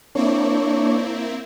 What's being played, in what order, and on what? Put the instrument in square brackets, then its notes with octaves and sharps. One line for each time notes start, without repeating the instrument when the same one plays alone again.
[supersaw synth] A#3 C4 E4 [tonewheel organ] D4 C#5